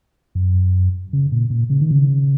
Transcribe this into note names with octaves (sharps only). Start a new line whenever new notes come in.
F#2
C#3
A#2
A#2
C#3
D#3
C#3